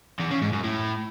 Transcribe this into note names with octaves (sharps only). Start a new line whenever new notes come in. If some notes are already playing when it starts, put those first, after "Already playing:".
E2
C#3
G#2
F#2
A2